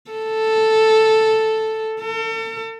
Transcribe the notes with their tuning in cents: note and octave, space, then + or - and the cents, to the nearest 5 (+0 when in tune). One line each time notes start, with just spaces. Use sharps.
A4 +0
A4 +40